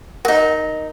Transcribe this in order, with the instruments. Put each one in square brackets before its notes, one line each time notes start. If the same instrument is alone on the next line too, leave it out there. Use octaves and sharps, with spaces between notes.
[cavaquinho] D#4 F#4 [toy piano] A#4